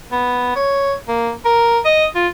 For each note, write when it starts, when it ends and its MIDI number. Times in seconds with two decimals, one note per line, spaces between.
0.12 0.52 59
0.56 0.93 73
1.08 1.31 58
1.45 1.79 70
1.85 2.05 75
2.15 2.27 65